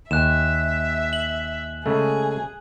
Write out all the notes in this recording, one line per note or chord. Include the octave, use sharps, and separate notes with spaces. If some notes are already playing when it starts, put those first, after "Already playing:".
D#2 E5 G#5 F#6 E7
F#7
C#3 G#3 A3 G#4